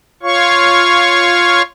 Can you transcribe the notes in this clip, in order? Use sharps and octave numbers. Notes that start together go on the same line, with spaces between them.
F4 C#5 F5 C#6